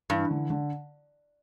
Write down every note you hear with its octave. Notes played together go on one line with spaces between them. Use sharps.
G2 E3
D3
D3